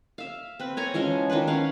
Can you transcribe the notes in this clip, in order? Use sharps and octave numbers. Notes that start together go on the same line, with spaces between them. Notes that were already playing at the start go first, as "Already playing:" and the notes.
E5 F5
C4 B4
C#5 G#5 A#5
E3 F3 G#3 C#4
D#3 F3 D4 B4
C#4 F5 F#5